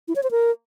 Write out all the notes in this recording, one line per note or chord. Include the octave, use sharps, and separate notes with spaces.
E4
C#5
C5
A#4